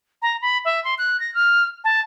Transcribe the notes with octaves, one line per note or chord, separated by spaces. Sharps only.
A#5
B5
E5
C6
F#6
A#6
F6
A5